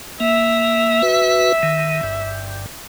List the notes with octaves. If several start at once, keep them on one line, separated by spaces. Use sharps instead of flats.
A#3 E5
F#4 B4
D#3
G1 G2